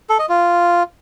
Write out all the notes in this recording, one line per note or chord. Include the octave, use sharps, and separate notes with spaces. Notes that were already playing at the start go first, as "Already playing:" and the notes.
A4
D#5
F4